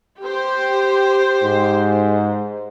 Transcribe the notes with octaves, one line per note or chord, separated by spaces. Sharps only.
G4 C5
G#2